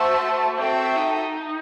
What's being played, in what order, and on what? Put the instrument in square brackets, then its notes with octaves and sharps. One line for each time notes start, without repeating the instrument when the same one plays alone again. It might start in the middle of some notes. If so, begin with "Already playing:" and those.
Already playing: [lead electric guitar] A3 [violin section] F#4 C5 E5 A5
[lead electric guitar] C4 [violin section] F#4 A4 E5 G5
[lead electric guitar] D#4